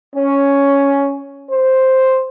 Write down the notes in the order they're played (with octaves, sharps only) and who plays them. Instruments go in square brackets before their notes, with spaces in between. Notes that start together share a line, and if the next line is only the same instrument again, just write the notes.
[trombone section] C#4
C5